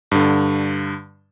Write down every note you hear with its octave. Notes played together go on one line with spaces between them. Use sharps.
G2 D3